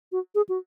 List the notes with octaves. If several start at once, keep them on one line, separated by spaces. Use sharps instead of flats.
F#4
G#4
F#4